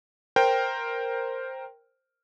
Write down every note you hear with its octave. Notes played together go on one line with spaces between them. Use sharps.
A#4 C5 G5